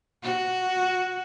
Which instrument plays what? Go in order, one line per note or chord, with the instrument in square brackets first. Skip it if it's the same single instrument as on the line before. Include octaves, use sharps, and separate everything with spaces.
[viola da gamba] F#4